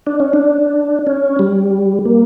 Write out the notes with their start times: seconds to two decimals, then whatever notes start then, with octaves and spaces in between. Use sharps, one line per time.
0.07 D4
0.20 C#4
0.33 D4
1.07 C#4
1.39 G3
2.05 A#3